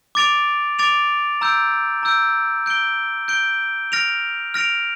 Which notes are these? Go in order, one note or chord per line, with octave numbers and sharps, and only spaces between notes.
D6 A6 D7 F7
D6 A6 D7 F7
A#5 E6 G6 D7
A#5 E6 G6 D7
G6 D7 G7
G6 D7 G7
F6 A#6 D7 F7
F6 A#6 D7 F7